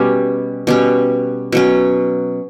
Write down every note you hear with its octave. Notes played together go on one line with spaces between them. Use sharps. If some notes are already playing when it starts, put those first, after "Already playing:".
Already playing: B2 G3 C#4
B2 G3 C#4
B2 F#3 C#4